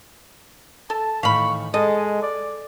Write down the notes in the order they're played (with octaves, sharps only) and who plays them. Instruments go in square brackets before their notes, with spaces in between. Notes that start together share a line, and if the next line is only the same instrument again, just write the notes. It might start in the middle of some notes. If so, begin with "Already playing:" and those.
[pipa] A4 [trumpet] A5
[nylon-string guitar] A2 D#3 E3 [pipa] F5 B5 [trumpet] C#6
[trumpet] G#3 [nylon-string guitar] A4 [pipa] D#5
[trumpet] D5